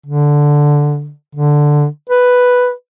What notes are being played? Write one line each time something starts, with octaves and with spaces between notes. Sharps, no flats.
D3
D3
B4